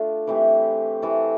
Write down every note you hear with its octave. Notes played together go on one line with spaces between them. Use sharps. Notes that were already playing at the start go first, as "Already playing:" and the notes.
Already playing: A3 D4 F4
E3 A3 C4 G4
E3 A3 C4 G4